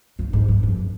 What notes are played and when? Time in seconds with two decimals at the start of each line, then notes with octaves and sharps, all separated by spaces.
0.19 G2
0.33 G#2
0.48 G2
0.63 F2